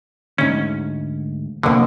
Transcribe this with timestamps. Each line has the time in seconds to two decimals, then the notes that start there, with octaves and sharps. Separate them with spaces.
0.38 D2 G#2 C#4
1.63 C2 F2 B2 D3 A#3